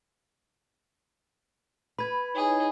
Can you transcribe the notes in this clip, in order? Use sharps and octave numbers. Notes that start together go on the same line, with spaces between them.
B4 B5 G#6
D#4 E4 G#4 C#5